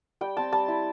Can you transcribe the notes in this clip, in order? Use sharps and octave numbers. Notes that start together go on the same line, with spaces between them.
G3 G5
C4 A5
G3 A5
E4